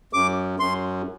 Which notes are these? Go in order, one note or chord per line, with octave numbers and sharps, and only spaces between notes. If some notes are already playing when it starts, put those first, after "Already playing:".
F#2 D6
F#2 C6